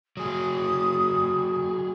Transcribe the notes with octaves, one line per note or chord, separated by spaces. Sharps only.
F#3 G#4 D#6